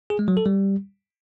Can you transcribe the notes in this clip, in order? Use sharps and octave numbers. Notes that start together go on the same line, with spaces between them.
G#4
G#3
F#3
A4
G3